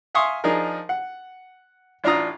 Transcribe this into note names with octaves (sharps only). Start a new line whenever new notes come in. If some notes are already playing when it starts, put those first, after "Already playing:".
E5 F5 G#5 C6 C#6 D#6
F3 D4 D#4 G#4 A#4
F#5
A1 D4 F4 A#5 D#6